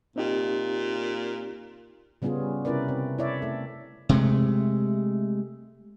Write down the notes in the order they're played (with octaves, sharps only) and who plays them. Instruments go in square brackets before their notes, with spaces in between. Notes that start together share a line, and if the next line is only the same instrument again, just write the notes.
[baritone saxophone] A#2 [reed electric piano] C4 D#4 G4
[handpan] C#3 G3 B3 C#4 F4 G#4
C3 C#4 E4 A#4 B4 D5
C4
E4 C#5 D5 E5
A3 A4
[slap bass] C3 G#3 A3